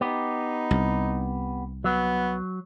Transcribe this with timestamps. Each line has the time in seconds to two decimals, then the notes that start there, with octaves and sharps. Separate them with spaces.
0.01 B3 D#4 G4
0.71 C2
1.84 F#3 B3